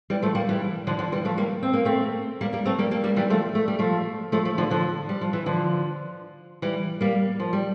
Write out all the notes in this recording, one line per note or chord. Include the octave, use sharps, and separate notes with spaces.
E3 G3
F3 A3
G3 A#3
E3 G3
D3 F3
D3 F3
E3 G3
F3 A3
G3 A#3
C4
A#3
A3 C4
G3 A#3
G3 A#3
A3 C4
G3 A#3
G3 A#3
G3 A#3
E3 G3
F3 A3
A3
G3
F3 A3
F3 A3
F3 A3
D3 F3
D3 F3
G3
F3
E3
D3 F3
E3 G3
G3 A#3
F3
G3